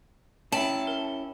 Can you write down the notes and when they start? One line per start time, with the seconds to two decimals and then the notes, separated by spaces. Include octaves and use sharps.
0.52 C#4 E4 E5 G5 A5 F#7
0.87 A#4